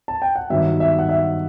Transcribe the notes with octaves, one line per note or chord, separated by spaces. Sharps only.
A5
G5
F#5
G2 D#3 F#3 B3 D#4 E5
E5
F#5
E5